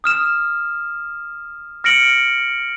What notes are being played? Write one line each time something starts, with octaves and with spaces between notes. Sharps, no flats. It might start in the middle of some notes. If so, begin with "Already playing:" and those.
D#6 F6 E7
F6 A#6 C#7 D7 F#7